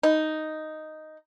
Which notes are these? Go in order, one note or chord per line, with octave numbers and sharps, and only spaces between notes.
D#4